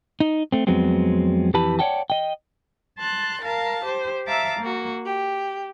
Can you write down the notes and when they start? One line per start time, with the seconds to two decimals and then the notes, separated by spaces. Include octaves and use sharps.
0.20 D#4
0.52 A3 C4
0.67 F2 F#3 G#3 B3 C4
1.54 F2 E3 G4 B4 A5 B5
1.79 C#5 D5 F#5 G5 A5
2.10 D#5 G5
2.99 A5 C6 F#6 A6
3.43 A#4 F5 A5
3.85 G4 C5
4.27 E5 F5 A5 A#5 D6 E6
4.61 A#3 F#4
5.05 G4